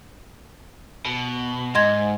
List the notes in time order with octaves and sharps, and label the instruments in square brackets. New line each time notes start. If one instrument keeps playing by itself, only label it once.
[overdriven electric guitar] B2
[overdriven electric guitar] G#2 [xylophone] D#5 C6 G#6